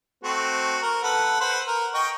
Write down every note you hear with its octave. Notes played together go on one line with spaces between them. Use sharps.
A3 C4 F#4
A#4
A4 B4 F#5
B4 C5 F#5
A#4
D#5 G5 C#6